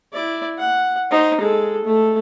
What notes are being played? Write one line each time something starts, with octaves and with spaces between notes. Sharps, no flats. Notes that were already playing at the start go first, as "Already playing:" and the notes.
E4 D5
F#5
D#4 C5
G#3 A4
A3 A4